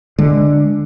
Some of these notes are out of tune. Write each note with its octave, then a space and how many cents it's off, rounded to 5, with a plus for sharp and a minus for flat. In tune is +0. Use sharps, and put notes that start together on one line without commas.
D3 +0 G#3 +0